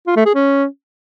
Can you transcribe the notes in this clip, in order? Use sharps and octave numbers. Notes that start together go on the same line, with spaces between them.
F4
A3
G#4
C#4